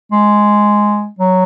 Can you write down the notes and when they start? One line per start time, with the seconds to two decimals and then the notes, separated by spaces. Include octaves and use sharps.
0.12 G#3
1.19 F#3